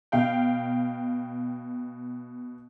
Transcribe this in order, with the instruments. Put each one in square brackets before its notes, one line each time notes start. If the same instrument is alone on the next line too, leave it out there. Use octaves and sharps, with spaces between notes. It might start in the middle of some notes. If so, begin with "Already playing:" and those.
[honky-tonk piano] B2 F5 G5